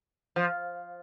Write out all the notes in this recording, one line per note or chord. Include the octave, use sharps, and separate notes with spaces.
F3